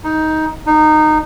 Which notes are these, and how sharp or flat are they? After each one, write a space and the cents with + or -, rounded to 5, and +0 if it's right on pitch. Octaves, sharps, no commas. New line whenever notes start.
D#4 +10
D#4 -20